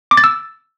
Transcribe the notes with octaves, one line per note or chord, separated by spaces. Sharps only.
D6
A6
E6